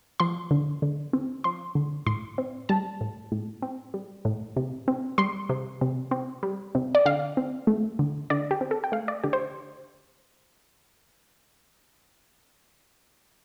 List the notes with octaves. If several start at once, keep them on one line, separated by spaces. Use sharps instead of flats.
F3 C6
D3
D3
C4
F3 C6
D3
A2 C6
C4
G3 A5
A2
A2
C4
G3
A2
C3
C4
G3 C6
C3
C3
C4
G3
C3
D5
D3 F5
C4
A3
D3
D3 D5
G4
C4
A4
G5
A3 F5
D5
D3 G4
C5